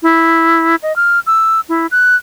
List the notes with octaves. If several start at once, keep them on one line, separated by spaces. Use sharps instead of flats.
E4
D#5
F6
E6
E4
F#6